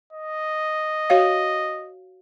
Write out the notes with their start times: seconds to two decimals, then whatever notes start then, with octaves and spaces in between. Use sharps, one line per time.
0.13 D#5
1.10 F#4 C#5 F5